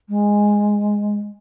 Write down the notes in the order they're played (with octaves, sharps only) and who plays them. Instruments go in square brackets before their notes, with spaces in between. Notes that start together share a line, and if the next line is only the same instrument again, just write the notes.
[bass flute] G#3